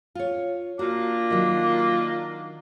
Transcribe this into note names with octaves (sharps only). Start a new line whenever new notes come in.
F4 C#5
A#3 D4 F4 F#4
D#3 F#3